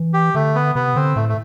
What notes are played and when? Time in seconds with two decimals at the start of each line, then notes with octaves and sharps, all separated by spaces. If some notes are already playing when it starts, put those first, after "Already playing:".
Already playing: E3
0.13 G4
0.35 D3 A3
0.55 B3
0.75 C3 B3
0.96 D3 C4
1.16 A2 A3
1.29 A3